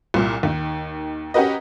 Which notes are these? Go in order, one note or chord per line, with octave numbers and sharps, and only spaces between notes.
C2 A#2
D#2 D#3
C#4 F#4 G4 A#4 B4 D#5